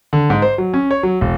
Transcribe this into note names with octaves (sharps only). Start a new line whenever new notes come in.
D3
G#2
C5
F#3
C#4
C#5
F#3
E1